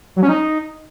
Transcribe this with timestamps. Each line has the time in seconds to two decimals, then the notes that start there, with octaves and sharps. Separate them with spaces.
0.16 F#3
0.23 C#4
0.29 D#4